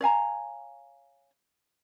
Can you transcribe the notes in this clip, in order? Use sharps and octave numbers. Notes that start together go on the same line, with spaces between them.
C#5 F5 G#5 A#5